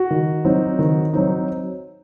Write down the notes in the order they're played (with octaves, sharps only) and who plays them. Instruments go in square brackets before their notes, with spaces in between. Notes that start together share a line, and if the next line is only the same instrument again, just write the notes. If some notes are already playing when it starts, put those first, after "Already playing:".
Already playing: [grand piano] F#4
D#3
F#3 C4 D#4
D#3
F#3 C4 D#4